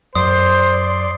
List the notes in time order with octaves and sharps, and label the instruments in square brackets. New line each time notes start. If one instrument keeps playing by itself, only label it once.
[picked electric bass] F#2 [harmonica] C5 [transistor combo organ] D5 C6 [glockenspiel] D#6